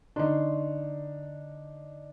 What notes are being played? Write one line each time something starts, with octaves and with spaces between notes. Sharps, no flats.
D3 D4 D#4 C6 C#6